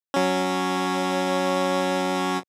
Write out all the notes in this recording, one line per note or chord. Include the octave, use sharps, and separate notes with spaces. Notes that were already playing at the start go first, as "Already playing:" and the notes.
F#3 C#4